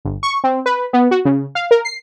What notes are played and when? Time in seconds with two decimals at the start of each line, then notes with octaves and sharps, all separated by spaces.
0.05 G1
0.23 C#6
0.44 C4
0.66 B4
0.93 B3
1.11 F#4
1.25 C#3
1.55 F5
1.71 A#4
1.85 C7